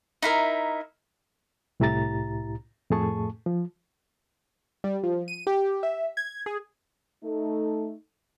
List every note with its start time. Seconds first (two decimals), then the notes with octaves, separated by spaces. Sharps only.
0.22 D#4 E4 A#4 E5
1.80 C2 A2 E4 G4 A#5 A6
2.90 F2 A2 A3 G#4 A5 C#6
3.46 F3
4.84 G3
5.03 F3
5.28 D#7
5.47 G4
5.83 E5
6.17 G#6
6.46 G#4
7.23 A3 D#4 A4